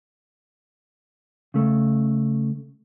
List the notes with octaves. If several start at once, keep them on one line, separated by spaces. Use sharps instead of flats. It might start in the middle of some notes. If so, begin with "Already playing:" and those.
C#3 A3